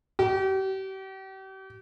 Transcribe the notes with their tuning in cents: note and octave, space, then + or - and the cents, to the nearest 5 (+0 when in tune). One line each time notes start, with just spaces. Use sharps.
G4 -40